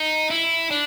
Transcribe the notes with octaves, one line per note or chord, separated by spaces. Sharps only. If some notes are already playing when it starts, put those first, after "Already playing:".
Already playing: D#4
E4
D4